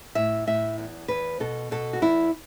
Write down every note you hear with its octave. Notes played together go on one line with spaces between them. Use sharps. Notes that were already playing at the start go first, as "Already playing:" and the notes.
A2 E5
A2 E5
E2
E2 B4
B2 A4
B2 A4
F#4
E2 E4